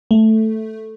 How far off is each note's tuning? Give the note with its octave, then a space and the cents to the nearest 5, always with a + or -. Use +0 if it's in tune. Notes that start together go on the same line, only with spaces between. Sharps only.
A3 +0